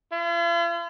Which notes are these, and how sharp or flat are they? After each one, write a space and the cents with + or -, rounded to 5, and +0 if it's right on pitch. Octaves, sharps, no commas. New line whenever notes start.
F4 -45